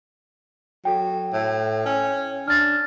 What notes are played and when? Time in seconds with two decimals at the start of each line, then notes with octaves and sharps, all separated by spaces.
0.85 F#3 A4 G5
1.33 A2
1.86 C#4
2.48 D4 F6 A6